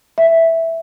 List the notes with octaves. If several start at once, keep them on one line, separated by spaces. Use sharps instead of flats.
E5